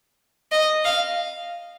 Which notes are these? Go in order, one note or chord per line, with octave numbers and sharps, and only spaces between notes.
D#5
F5